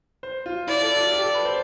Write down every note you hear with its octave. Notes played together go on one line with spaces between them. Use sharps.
C5
F4
E4 D5
A4
F4
G4
A4
B4
C5